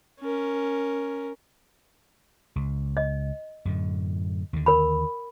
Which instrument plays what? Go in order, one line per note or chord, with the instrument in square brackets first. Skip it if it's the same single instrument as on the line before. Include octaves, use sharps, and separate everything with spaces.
[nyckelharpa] C#4 A#4
[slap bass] C#2
[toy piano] D#5
[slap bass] F#2 A2 D3
D#2 D3
[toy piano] A#4 B5